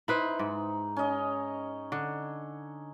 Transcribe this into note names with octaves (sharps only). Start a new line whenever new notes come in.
D#4 E4 B4 C5
G#2
C#4 D#5
D3